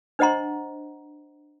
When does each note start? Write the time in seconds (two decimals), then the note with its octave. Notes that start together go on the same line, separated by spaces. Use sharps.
0.19 D4 C5 D#5 F#5 A#5 C6